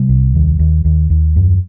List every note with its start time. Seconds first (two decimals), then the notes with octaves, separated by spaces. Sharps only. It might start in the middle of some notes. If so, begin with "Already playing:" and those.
Already playing: C3 G3
0.09 C2
0.35 D#2
0.59 D#2
0.85 D#2
1.10 D#2
1.36 F#2